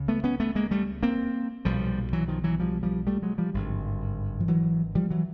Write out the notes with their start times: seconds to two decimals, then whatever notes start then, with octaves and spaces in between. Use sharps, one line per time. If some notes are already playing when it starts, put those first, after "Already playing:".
Already playing: C#2 C#3
0.08 A3 B3
0.24 B3 C#4
0.40 A3 B3
0.55 G#3 A#3
0.71 G3 A3
1.03 A#3 C4
1.65 B1 A#2 F3 G3
2.13 E3 F#3
2.28 D#3 F3
2.44 E3 F#3
2.60 F3 G3
2.83 F3 G3
3.07 G3 A3
3.23 F#3 G#3
3.38 F3 G3
3.54 G#1 G2 D3
4.40 F3
4.48 E3 F#3
4.95 F3 G3
5.11 E3 F#3